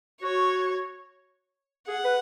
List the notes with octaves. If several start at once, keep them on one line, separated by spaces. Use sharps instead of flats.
F#4 C#5
G#4 F#5
B4